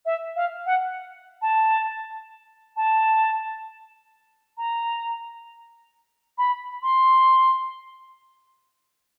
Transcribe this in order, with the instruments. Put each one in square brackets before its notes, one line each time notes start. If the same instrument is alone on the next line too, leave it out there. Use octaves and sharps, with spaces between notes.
[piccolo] E5
F5
F#5
A5
A5
A#5
B5
C6